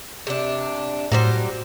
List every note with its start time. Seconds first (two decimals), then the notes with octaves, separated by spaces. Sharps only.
0.27 C3 D4
1.12 A2 F#3 G3 C5